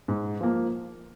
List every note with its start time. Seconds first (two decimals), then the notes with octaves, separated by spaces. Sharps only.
0.08 G#2
0.41 F3 A#3